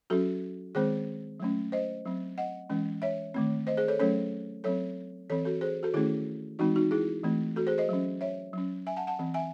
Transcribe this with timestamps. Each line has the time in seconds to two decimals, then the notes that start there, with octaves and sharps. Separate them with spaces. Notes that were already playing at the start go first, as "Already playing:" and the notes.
0.10 F#3 C#4 F#4 A4
0.75 D#3 G#3 C4 G#4 C5
1.40 F#3 A3 C#4
1.72 C5 D#5
2.05 F#3 C4
2.38 D#5 F#5
2.70 E3 G#3 C#4
3.02 C#5 E5
3.34 D#3 A3 C4
3.67 C5 D#5
3.77 G#4 C5
3.88 A4 C#5
3.99 F#3 A3 C#4 A4 C#5
4.64 F#3 C4 A4 C#5
5.30 E3 C4 A4 C#5
5.45 F#4 A4
5.61 G#4 C5
5.83 F#4 A4
5.94 D#3 A3 C#4 E4 G#4
6.59 E3 G#3 C4 D#4 F#4
6.76 D#4 F#4
6.91 E4 G#4
7.24 E3 A3 C4
7.56 F#4 A4
7.67 G#4 C5
7.78 C5 D#5
7.89 F#3 C#4
8.21 C#5 E5
8.53 F#3 C#4
8.87 E5 G#5
8.97 F#5 A5
9.07 F#5 A5
9.19 E3 C4
9.34 E5 G#5